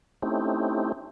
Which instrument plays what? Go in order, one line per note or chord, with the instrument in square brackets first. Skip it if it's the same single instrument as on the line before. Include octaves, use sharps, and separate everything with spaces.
[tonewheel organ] A3 C4 C#4 D#4 E4 G4